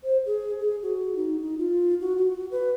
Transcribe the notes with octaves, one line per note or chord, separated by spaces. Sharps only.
C5
G#4
G#4
F#4
D#4
D#4
F4
F#4
F#4
B4